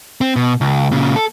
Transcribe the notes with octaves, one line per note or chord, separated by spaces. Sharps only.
C4
B2
C#2
A#2 C#3
A4